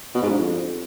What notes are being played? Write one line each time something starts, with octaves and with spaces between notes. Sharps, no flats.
B2
G#2
G2
F2